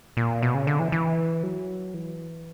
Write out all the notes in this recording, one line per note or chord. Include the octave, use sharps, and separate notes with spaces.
A#2
B2
C#3
D3
E3
E3
F#3
E3